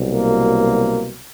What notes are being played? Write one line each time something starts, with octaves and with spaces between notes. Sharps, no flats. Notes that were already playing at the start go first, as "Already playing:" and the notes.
Already playing: C2 B2 F#3
A#3